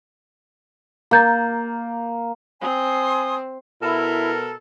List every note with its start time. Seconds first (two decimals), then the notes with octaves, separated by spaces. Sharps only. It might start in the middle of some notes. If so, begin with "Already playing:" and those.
1.11 A#3 A#5 G6 A6
2.61 C4 G#5 C6 D#6
3.83 B2 E4 A4 A#4